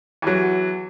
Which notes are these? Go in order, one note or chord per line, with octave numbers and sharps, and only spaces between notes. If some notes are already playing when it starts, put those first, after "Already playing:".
E2 F#3